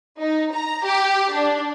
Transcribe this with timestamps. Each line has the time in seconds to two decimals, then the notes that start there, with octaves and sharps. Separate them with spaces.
0.19 D#4
0.53 A#5
0.84 G4
1.32 D4